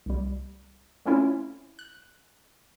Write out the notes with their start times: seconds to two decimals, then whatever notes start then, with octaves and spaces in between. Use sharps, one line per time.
0.06 C2 G3
1.06 A3 C4 C#4 E4 F4
1.79 F#6